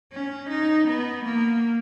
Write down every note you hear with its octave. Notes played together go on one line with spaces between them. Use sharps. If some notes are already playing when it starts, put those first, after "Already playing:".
C#4
D#4
B3
A#3